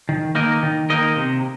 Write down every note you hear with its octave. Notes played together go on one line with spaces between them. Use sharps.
D#3
A#3 D#4 A#4 D#5
D#3
A#3 D#4 A#4 D#5
C3